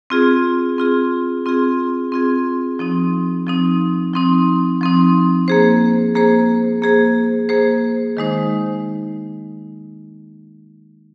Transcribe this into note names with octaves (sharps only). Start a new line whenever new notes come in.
C4 F4 G#4
C4 F4 G#4
C4 F4 G#4
C4 F4 G#4
F3 C4 D#4
F3 C4 D#4
F3 C4 D#4
F3 C4 D#4
A#3 G#4 C5
A#3 G#4 C5
A#3 G#4 C5
A#3 G#4 C5
D#3 G#3 D#4 C5